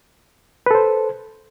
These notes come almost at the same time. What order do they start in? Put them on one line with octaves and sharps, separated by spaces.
B4 A4 C5